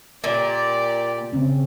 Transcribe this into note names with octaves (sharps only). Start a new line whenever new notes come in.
A#2 G4 D5
C#3 C4 C#4